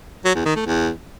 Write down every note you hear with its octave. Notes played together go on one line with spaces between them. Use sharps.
F#3
E2
D#3
A3
E2